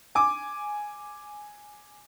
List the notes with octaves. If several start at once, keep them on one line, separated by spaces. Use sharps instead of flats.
G#5 D6